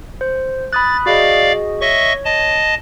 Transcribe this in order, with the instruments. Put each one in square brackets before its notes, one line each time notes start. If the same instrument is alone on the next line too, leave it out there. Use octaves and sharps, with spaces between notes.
[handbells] C5
[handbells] B5 D#6 F#6 [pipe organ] A6
[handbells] F#4 G#4 D#5 [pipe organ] D5 F5
[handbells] C#5 [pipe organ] D#5 E5 C#6
[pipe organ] D#5 A5